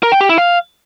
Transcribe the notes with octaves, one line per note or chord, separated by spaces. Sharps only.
A#4
G5
G4
E4
F5